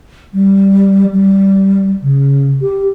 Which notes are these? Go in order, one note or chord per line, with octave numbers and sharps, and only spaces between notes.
G3
G3
C#3
G4